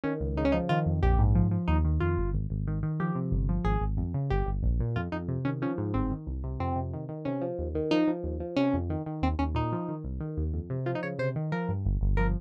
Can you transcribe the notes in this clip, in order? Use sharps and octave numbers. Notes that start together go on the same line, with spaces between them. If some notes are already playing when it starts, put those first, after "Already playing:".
D#3 C#4
C#2
C#3 D#4
C#4
F3 D#4
D#3 F4
F2
A#1 G4
G#2
F3
F3
D#2 D#4
D#3
F2 F4
G1
G#1
G#1
D#3
D#3
F3 G4
C3
G1
F3
G#1 G#4
G#1
F2
C#3
G1 G4
G1
A#1
A#2
F2 F4
F2 D#4
C3
D#3 C#4
F3 C#4
G#2
G1 C4
D#3
C2
C3
F2 C4
C3
D#3
D#3
C3 C#4
F3
D#2
D#3
F3 D#4
F3
D#2
F3
C3 C#4
F2
D#3
D#3
D#2 C4
D#2 C#4
A#2 D#4
F3
D#3
C2
D#3
D#2
F2
C3
F3 F4
D#4
C#3 C#5
C3 C5
D#3
F3 A#4
G2
G1
G1
F3 A#4